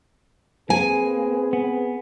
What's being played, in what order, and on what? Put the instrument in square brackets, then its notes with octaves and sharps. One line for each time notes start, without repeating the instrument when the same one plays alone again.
[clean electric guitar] A#3 [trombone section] C4 G#4 B4 [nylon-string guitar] G#5
[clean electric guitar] B3